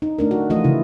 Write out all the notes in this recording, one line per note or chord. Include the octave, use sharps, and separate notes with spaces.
D#4
A3 D4 A#4
F#4
E3 F3 A3 F4 F#4 D#5
C#3 E4